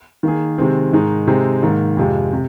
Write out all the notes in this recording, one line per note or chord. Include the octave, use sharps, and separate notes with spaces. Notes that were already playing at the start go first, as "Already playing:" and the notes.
D#3 A#3 G#4
C3 D#3 G#3 C4
G#2 D#3 G#3 D#4
C3 G#3 C4 D#4
G#2 D#3 A#3
F2 C3 G#3 F4
C3